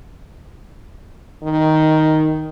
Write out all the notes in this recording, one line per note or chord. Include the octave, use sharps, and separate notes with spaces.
D#3